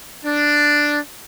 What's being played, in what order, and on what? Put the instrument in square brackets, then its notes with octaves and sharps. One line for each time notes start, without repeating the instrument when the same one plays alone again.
[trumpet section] D4